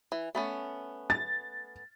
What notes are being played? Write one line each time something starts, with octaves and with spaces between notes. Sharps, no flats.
E3
A3 B3 C#4
A6